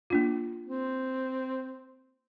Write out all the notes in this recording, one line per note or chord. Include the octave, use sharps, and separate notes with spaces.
A#3 D4 F4
C4